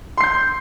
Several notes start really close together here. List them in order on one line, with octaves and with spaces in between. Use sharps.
C6 C7 G6